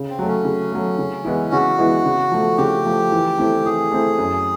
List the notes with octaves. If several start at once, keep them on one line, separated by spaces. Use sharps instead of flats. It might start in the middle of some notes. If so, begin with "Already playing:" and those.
Already playing: C#3
C4
F#3 A3
C#4
C#3
F#3 A3
C#3
E3 G#3 B3 E4
C#3 F#4
E3 G#3 B3 E4
C#3
F3 A3
C#3 G4
F3 A3
E3
A3 C4 E4
E3 G#4
A3 C4 E4
F#2